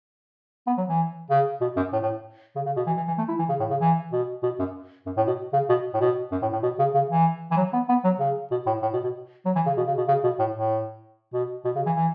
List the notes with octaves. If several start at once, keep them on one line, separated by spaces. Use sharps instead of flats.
B3
F#3
E3
C#3
B2
F#2
A2
A2
C#3
C#3
B2
E3
E3
E3
A3
E4
E3
C#3
A2
C#3
E3
B2
B2
F#2
F#2
A2
B2
C#3
B2
A2
B2
F#2
A2
A2
B2
C#3
C#3
E3
E3
F#3
B3
B3
F#3
C#3
B2
A2
A2
B2
B2
F#3
E3
C#3
B2
C#3
B2
C#3
B2
A2
A2
B2
B2
C#3
E3
E3